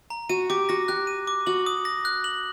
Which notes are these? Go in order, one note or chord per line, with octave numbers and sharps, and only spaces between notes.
A#5
F#4 D#7
G4 D6
F#4 A#6
G4 F#6
D#7
D6
F#4 F#7
D#6
A#6
F#6
F#7